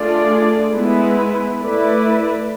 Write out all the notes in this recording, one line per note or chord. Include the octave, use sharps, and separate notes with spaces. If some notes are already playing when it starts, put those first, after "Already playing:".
Already playing: A3 D4 F4 G#4 D5
G#3 B3 E4 B4
A3 E4 B4 D5